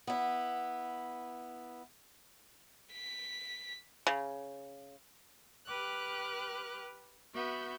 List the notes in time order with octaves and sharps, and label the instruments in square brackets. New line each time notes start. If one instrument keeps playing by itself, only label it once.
[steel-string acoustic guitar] B3 E4
[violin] B6
[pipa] C#3
[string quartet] G4 B4 G5 D6 F6 F#6
B3 F#4 E5 G6